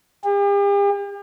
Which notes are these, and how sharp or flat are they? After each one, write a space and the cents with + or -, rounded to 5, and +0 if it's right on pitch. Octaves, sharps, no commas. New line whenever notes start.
G4 +45